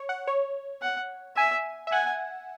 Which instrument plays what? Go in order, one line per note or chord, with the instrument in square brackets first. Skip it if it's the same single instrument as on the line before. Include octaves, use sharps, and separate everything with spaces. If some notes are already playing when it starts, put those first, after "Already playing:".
Already playing: [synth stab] C#5
F#5
C#5
[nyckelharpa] F#5
[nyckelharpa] E5 [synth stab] G#5
[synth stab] E5
[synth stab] F#5 [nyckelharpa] G#5